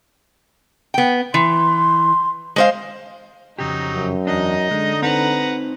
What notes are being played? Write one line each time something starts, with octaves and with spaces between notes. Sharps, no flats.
B3 G5
E3 C6
G#3 C5 F5
F2 C#3 F#3 D#4 G4
F#2
E2 D4 D#4 D#5
D3 G#3
C4 D#4 B4 C5 F#5 A#5